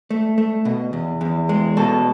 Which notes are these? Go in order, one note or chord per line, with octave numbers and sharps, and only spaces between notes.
A3
A3
B2
E2
E2
G#3
B2 A4